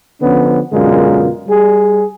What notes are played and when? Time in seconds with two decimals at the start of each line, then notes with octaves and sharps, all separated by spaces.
0.22 D3 F3 B3 C#4
0.73 F#2 B2 D3 G#3 F4 A#4
1.48 G3 G#4